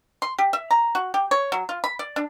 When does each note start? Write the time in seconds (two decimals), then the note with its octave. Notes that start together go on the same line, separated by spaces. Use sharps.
0.22 C6
0.39 G4
0.53 E5
0.71 A#5
0.95 F#4
1.14 G4
1.31 C#5
1.52 F#3
1.69 F4
1.84 B5
1.99 D5
2.16 D4